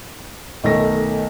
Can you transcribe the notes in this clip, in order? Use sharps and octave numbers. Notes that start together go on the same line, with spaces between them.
B1 D#3 A3 A#6